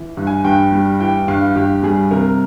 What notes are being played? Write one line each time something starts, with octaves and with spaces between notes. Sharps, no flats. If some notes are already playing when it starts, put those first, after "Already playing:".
Already playing: E3
G2
G#5
G2 G5
G3
E3 G5
G2 F5
G2 G4
G3 G#4
C3 A#4